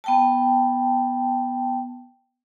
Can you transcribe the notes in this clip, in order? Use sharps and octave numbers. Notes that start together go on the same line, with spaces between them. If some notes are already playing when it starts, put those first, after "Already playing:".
B3 G5 A5